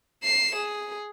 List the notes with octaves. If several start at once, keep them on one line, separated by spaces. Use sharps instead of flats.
C7 E7
G#4